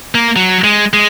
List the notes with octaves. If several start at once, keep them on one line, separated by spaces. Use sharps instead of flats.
A#3
F#3
G#3
G#3